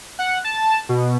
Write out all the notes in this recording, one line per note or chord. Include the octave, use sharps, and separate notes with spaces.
F#5
A5
B2